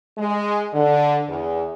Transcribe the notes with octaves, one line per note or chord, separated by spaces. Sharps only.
G#3
D3
E2